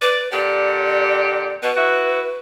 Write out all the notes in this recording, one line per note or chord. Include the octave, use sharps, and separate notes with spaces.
B4 D5
A#2 D3 G4 D5
B2 B4
E4 F#4